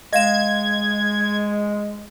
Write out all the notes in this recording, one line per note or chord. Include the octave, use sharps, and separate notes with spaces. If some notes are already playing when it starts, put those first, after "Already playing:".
G#3 D#5 F5 G#6 E7